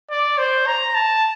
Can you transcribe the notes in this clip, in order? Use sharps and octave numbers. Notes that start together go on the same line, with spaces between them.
D5
C5
A#5
A5